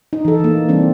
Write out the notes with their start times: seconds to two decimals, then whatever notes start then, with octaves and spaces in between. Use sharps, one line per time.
0.13 D#4
0.25 E3 A4
0.40 E3 A#3
0.69 E3 G3 C4 D4